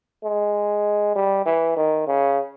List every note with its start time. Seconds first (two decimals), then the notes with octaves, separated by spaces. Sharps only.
0.24 G#3
1.16 G3
1.46 E3
1.77 D#3
2.07 C#3